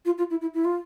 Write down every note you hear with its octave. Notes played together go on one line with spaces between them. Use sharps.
F4
F4
E4
E4
E4
F4